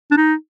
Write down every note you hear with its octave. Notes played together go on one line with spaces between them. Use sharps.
D4
D#4